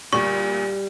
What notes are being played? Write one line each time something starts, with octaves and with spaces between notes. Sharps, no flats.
D2 A#2 G3 C#6